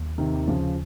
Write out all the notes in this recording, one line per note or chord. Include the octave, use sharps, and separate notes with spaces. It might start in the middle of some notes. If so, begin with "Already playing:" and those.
Already playing: D#2
C3 D#3
D#2
C#3 F3